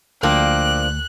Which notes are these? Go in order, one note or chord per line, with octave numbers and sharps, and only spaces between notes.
D2 F3 A#3 D4 G5 D6 E6 F#6